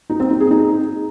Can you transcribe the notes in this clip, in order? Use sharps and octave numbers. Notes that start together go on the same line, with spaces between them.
D#4
C4
D#4
G#4
D#4